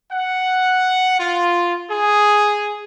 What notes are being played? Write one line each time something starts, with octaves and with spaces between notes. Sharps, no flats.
F#5
F4
G#4